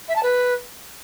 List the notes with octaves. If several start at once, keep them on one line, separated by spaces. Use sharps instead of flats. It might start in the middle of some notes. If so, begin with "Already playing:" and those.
E5
A5
B4